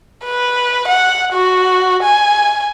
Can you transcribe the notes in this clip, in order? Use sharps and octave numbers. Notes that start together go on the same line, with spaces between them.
B4
F#5
F#4
G#5